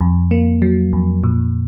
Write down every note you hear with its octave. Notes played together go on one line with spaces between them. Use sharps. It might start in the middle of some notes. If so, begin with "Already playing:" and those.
F2
A#3
F#3
F2
A#2